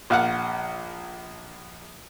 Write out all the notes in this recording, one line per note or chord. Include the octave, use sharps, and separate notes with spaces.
A#1 F5 F#5